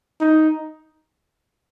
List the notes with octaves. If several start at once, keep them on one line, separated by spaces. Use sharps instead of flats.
D#4